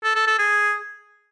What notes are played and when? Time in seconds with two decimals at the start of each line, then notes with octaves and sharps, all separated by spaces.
0.04 A4
0.15 A4
0.27 A4
0.39 G#4